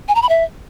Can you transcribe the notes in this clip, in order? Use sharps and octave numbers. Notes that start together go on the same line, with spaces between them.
G#5
A#5
B5
E5